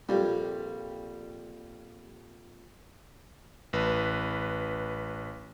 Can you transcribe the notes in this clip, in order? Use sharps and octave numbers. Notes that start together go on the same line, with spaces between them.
A#1 F2 A#2 G3
A1 B4